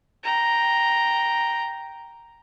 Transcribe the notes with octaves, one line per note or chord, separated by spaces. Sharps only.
G5 A#5